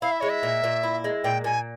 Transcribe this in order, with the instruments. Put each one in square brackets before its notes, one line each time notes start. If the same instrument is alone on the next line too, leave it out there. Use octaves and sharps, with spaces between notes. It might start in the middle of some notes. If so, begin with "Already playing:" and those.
[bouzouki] E4 [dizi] F5
[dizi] E5
[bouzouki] G#3 [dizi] C#5
[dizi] E5
[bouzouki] A#2
A#2
E4
G#3
[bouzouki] A#2 [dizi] G5
[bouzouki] A#2 [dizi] G#5